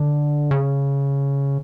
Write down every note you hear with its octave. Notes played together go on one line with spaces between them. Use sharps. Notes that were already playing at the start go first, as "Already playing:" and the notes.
Already playing: D3
C#3